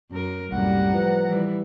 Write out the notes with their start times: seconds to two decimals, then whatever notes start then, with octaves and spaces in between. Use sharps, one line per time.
0.11 F#2 A#4
0.52 C2 F#2 A2 G3 A#3 F#5 A#5
0.93 F3 B4
1.25 E3 G3 E4